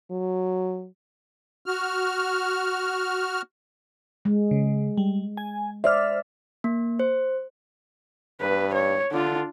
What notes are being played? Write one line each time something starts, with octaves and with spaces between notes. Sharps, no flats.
F#3
F#4 F6
G#3
C#3
G3
G#5
C5 D5 E5 F6
A#3
C5
G2 B4
C#5
D3 D4 F4